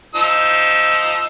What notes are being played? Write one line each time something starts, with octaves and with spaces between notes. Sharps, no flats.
F3 D#4 E6